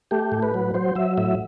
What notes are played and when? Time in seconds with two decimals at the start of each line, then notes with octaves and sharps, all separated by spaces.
0.11 A3 G4
0.32 A2
0.43 B4
0.54 F#3
0.74 F#3 C5
0.95 F#3 E5
1.18 A2 E5